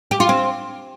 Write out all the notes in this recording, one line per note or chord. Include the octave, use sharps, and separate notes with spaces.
G4
F4
C4